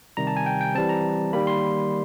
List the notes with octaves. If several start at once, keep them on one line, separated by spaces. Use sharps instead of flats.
C3 D#3 G3 A#5
A5
G#5
G5
G5
E3 G3 C4 A5
A#5
D#3 G3 A#3 B5
C6